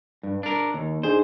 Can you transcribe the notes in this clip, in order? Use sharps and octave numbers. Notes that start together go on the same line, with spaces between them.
G2
D4 A#4
D#2
D4 D#4 G#4 C5